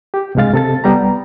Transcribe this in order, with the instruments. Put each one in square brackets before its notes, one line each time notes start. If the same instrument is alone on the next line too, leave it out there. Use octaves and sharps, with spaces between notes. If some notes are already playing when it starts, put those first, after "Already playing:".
[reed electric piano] G4
C2 G2 C3 G#3 F5 A6
C3 A4 A6
C2 G3 B3 G4 A#5